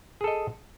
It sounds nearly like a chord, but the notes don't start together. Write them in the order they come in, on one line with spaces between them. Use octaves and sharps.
G#4 A4 D#5